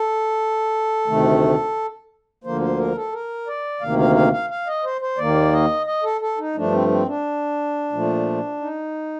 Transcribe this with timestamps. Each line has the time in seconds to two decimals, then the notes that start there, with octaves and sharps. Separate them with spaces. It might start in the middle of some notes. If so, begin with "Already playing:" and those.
Already playing: A4
1.07 D2 C3 D#3 A3
2.44 D2 D3 F3 A#3 C5
2.61 C5
2.78 A#4
2.96 A4
3.12 A#4
3.47 D5
3.81 D2 C3 D#3 A#3 F5
3.99 F5
4.15 F5
4.33 F5
4.50 F5
4.67 D#5
4.84 C5
5.01 C5
5.18 D#2 D#3 A#3 D5
5.53 D#5
5.86 D#5
6.03 A4
6.21 A4
6.38 D#4
6.55 G2 F3 A3 D4
6.72 C4
6.89 C4
7.06 D4
7.92 A#2 F3 A3
8.61 D#4